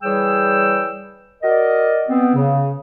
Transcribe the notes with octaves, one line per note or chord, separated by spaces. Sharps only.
E3 G3 G#4 C#5 G5 E6
F#4 A#4 D5 D#5
B3 C4
C#3